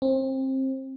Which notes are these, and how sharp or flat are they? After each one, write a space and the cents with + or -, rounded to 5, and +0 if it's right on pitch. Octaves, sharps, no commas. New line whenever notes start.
C4 +25